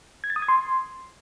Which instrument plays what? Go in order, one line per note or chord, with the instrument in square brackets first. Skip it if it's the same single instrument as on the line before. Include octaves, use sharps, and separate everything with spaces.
[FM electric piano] G#6
A6
D#6
G#6
C6